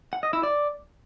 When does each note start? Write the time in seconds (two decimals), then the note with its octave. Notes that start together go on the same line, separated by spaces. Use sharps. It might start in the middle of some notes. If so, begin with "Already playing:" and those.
0.13 F#5
0.23 D#5
0.33 E4
0.43 D5